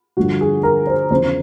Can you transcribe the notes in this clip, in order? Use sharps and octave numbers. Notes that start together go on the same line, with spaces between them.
G2 D3 F3 F#4
G#4
A#4
C5
E2 C#3 F3 C5